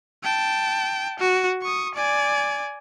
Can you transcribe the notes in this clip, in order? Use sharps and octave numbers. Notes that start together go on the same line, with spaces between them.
G5 A5
F#4
C#6 D#6
D5 G#5